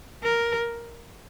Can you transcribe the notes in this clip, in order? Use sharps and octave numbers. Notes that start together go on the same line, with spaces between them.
A#4